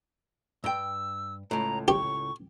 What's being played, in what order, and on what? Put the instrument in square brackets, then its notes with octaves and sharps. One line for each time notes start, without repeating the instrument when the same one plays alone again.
[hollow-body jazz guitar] G2 G5 [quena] E6
[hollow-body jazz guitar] C#2 A2 [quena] A#5
[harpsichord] G4 [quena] C#6